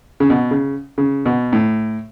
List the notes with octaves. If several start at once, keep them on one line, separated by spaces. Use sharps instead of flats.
C#3
B2
C#3
C#3
B2
A2